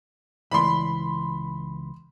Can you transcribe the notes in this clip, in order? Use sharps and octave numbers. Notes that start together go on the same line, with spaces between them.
C#2 E3 D5 B5 C6